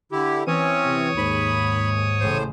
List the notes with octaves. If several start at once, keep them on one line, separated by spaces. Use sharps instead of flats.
D3 E4 G4
E3 C4 C#4 C#5 D#6
C3
D#2 G#2 B5
A1 A2 C#3 C5